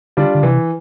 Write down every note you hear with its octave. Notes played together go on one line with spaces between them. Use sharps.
D3 G3 D4 F4
D3
C3 E3